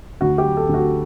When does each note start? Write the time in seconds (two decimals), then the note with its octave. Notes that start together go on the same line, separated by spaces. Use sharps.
0.21 D2 F#4
0.38 G4
0.44 F#3
0.57 A4
0.69 D2
0.74 F#4